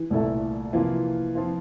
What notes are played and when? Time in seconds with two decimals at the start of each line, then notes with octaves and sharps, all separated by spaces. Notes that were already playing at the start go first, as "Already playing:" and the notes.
Already playing: E3
0.10 C2 A#2 A3 E4 A4
0.73 C3 E3 F3 A#3 F4
1.35 F3 C4 F4